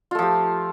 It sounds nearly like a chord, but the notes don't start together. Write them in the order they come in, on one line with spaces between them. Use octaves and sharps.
F4 A3 F3 G4